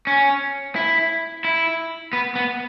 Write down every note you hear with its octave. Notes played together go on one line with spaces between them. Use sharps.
C#4
E4
E4
B3
B3